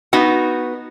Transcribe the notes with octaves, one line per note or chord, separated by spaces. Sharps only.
B3 D#4 F#4